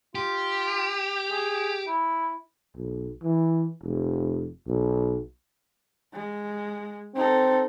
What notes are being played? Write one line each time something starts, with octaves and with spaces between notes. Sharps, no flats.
F4 G4
G#4
E4
B1
E3
F1
B1
G#3
C4 D#4 A4